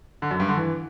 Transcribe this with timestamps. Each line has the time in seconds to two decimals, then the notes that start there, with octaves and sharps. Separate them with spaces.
0.22 D3
0.31 F#2
0.40 G2
0.48 D3
0.57 E3